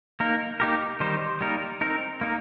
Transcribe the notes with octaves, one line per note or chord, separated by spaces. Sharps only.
A#3 D#4 A#4
A#3 D#4 G4 A#4
D#3 G3 D#4 C5
G3 A#3 D#4 A#4
C4 D#4 A#4
A#3 D#4 A#4